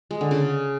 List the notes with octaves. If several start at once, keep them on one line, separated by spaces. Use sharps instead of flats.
G#3
D3
C#3